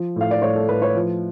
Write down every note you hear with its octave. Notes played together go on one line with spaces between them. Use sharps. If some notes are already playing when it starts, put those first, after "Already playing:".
Already playing: F3
A2 F5
D5
A2 C#5
A4
A2 B4
C#5
F3